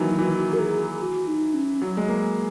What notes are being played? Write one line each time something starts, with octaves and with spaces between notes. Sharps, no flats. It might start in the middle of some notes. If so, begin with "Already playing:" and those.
Already playing: D#3 E3 F#3 A#3
E4
E3 F#4
A#4
G#4
F#4
D#4
C#4
F#3
G#3
A#3